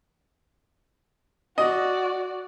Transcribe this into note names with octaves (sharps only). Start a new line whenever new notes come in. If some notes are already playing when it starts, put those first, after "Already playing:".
F#4 D5 D#5